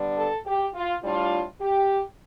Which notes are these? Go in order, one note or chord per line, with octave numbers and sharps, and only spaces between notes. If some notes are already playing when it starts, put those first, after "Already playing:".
Already playing: D3 G3 B3 D4
A4
G4
F4
A2 G3 D4 F4
G4